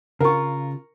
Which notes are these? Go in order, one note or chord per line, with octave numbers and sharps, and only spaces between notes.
C#3 F4 A#4 C#6